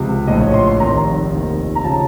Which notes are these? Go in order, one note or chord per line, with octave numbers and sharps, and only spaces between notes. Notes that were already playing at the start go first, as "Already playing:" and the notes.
Already playing: C#2 C3 F3
A#1 A2 F3 D#5
C#5
C6
C6
F1 F2 D#3 A#5
F1 D#2 D#3
A#5
C#3 F3 A5